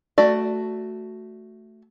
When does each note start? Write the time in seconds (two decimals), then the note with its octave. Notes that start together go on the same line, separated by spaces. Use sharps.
0.18 A3 F#4 D5